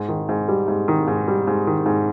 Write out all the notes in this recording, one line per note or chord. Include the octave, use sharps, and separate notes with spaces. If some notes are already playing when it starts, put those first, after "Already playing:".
Already playing: G#2
D#3
G#2
G3
G#2
D#3
G#2
G3
G#2
D#3
G#2